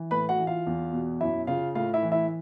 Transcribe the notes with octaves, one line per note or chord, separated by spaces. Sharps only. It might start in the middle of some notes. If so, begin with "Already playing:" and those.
Already playing: E3
A2 B4 B5
F#4 F#5
E3
F4 F5
E2
B2
F#2 E4 E5
C#3 F4 F5
A2 F4 F5
E4 E5
E3
E4 E5